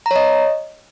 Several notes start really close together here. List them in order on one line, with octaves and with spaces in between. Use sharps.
A#5 C#5 D#5